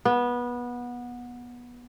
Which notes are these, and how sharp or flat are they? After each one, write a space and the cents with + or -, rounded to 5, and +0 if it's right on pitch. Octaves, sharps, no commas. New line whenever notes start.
B3 -20